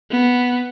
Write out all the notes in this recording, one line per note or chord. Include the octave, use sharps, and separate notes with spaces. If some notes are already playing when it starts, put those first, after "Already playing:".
B3